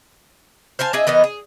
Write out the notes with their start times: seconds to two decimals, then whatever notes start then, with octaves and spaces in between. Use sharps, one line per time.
0.79 C5 F5 G#5 A5
0.93 D4 G#4 D#5 E5
1.07 E3 B3 A#4 D#5
1.24 G#4